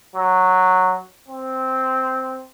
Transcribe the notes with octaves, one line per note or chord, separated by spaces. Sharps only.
F#3
C4